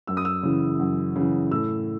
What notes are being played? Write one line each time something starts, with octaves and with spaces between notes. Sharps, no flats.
F#2 E6
D#6
E6
C#3 E3
F#2
C#3 E3
A2 E6